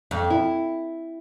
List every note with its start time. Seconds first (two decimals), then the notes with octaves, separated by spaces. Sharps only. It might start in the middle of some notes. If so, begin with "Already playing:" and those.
0.11 F2
0.30 E4